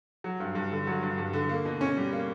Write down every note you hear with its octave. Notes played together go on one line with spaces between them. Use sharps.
F#3
G2
G2
D3
F#3
G2
G2
D3
A#3
B2
C#4
G3
A#3